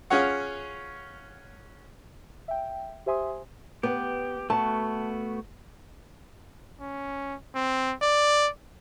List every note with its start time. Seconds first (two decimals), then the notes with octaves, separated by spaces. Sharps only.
0.10 C#4 F4 G#4 C#5 F#5
2.48 E5 G5
3.06 G4 C5 E5 G#5 C6 D#6
3.83 B3 G4
4.50 A3 B3 F#4 A5
6.80 C#4
7.55 C4
8.02 D5